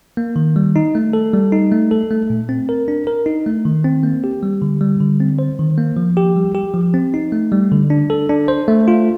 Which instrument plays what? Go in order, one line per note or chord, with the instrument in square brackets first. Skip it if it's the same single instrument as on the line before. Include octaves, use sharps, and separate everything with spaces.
[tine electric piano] A#3
D#3
G3
D#4
A3
A4
G3
D#4
A3
A4
A3
A#2
C4
A#4
D4
A#4
D#4
A3
D#3
C4
A#3
G4
G3
D3
G3
D3
C4
C5
D#3
A#3
F3
G4
G3
G4
F3
C4
D#4
A3
G3
D3
D4
A4
D4
C5
A3
F4